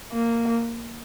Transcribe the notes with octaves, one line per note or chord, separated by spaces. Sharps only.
A#3